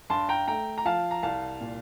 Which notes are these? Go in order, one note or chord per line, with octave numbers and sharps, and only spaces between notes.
G2 A5 C6
G5 A#5
A3 G5 A#5
A#5
F3 F5 A5
A#5
C2 F5 A5
A#2